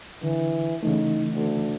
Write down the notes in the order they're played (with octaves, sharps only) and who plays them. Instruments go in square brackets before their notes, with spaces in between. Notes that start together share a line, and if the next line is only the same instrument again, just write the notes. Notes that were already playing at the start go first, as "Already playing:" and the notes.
[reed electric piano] D3 [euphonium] E3
[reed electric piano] C#3 E3 A3 [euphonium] D#4
[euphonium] D2